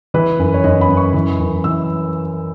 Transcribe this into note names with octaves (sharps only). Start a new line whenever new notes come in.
E3 B4
F#2
C#5
F#2 D#5
B5
F#2
C#6
E3
F#2
E3 E6